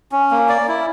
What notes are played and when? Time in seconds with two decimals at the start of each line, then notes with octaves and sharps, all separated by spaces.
0.12 C#4
0.31 A#3
0.49 D5
0.68 E4